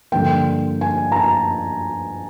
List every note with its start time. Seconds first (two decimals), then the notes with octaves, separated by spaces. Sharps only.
0.12 G2 D3 F3 A#3 G5
0.81 G#5
1.12 A#5
1.16 A5